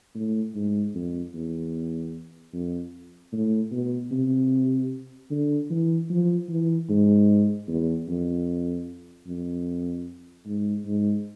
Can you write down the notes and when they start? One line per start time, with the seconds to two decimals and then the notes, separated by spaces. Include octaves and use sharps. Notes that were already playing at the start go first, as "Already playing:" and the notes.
0.15 A2
0.55 G#2
0.95 F2
1.34 E2
2.53 F2
3.33 A2
3.72 B2
4.12 C3
5.31 D3
5.70 E3
6.10 F3
6.49 E3
6.89 G#2
7.68 E2
8.08 F2
9.27 F2
10.46 G#2
10.86 G#2